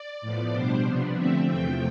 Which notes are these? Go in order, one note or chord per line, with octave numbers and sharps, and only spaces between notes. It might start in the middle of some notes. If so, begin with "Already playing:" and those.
Already playing: D5
A2 F3 B3
B2 G3 D4 C5
C3 F3 B3 D4
D3 F3 A3 C4 E5
E2 C3 F3 A3 G5